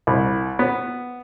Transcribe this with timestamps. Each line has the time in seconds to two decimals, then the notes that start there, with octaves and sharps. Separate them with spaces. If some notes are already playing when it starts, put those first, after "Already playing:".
0.07 C2
0.59 B3